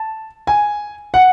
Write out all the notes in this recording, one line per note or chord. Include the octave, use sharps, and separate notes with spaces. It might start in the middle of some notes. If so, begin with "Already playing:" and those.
Already playing: A5
G#5
F#5